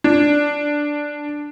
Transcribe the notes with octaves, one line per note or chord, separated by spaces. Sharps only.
D4